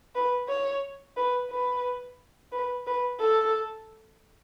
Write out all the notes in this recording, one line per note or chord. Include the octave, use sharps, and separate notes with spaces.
B4
C#5
B4
B4
B4
B4
A4